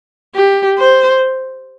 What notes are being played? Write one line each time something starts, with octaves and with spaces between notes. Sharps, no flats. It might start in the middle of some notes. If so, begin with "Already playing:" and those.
G4
C5